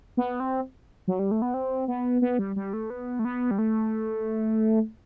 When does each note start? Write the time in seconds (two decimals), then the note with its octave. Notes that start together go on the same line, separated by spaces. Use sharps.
0.17 B3
0.40 C4
1.08 F#3
1.19 G3
1.31 A3
1.42 B3
1.54 C4
1.88 B3
2.22 B3
2.39 G3
2.56 G3
2.73 A3
2.90 B3
3.19 A3
3.25 B3
3.51 G3
3.59 A3